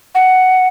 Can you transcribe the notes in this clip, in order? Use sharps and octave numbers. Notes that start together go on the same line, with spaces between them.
F#5